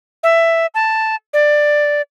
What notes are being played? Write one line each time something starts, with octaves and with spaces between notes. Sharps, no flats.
E5
A5
D5